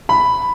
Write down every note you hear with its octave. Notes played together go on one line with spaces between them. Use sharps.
B5